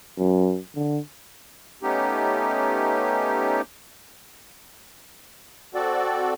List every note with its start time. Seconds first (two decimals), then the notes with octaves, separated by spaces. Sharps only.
0.18 F#2
0.76 D3
1.83 A3 B3 C#4 D#4 G4
5.74 C4 F#4 A4 D5